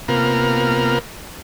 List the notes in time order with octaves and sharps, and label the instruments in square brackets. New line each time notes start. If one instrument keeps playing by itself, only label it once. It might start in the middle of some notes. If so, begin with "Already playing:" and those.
[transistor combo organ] C3 A#3 B3 F4 A#4